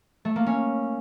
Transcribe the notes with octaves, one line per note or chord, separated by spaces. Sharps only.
A3
A#3
C#4